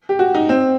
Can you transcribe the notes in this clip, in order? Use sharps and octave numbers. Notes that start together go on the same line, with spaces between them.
G4
F#4
D#4
C4